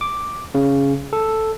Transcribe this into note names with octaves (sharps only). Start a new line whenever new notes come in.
D6
C#3
A4